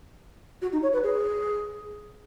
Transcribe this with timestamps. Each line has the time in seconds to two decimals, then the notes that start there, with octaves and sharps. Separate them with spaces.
0.62 F#4
0.73 D#4
0.83 C#5
0.93 B4
1.03 G#4